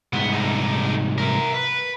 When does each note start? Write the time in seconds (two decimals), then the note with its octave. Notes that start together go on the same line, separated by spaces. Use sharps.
0.13 C2 G#2 B3
0.33 D#4 A4
1.18 A#4 E5
1.54 B4